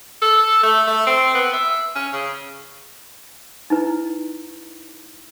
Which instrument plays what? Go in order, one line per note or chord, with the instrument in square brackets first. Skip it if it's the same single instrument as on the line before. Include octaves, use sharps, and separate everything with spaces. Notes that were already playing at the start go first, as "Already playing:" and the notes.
[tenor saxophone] A4
A3
A3
C4
B3
E5
C#4
C#3
[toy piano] D#4 E4 B4